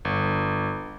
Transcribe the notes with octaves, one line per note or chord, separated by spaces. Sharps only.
G1